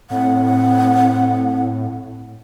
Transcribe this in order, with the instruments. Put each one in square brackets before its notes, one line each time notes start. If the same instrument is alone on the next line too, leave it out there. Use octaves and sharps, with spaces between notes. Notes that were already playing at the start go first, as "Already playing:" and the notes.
[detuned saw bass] A2 [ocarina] C4 [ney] F#5